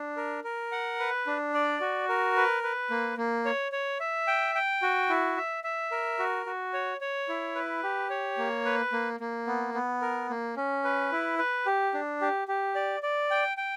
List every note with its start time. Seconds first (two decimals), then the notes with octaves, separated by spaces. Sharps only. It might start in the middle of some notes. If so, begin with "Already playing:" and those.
Already playing: D4
0.17 A#4
0.44 A#4
0.72 F#5
0.99 B4
1.27 D4
1.54 D5
1.81 F#4
2.09 A#4
2.36 B4
2.63 B4
2.90 A#3
3.17 A#3
3.45 C#5
3.72 C#5
4.00 E5
4.27 G5
4.55 G5
4.82 F#4
5.09 E4
5.37 E5
5.64 E5
5.91 A#4
6.19 F#4
6.46 F#4
6.73 C#5
7.01 C#5
7.29 E4
7.55 B4
7.83 G4
8.10 C#5
8.38 A#3
8.65 B4
8.92 A#3
9.20 A#3
9.47 B3
9.74 B3
10.02 A#4
10.30 A#3
10.57 C#4
10.84 B4
11.12 E4
11.39 B4
11.66 G4
11.94 D4
12.21 G4
12.48 G4
12.75 D5
13.03 D5
13.31 G5
13.57 G5